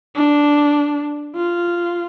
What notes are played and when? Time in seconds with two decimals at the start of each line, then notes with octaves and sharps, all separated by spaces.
0.17 D4
1.37 F4